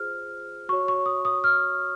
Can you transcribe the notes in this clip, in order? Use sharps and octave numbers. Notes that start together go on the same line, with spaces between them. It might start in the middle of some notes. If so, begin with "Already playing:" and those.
Already playing: F4 G#4 C5 F6
F#4 C#5 C#6
C#6
D#6
D#6
F6